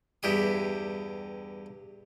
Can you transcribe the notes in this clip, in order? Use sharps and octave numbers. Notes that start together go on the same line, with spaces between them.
E2 G2 E4 G4 D#6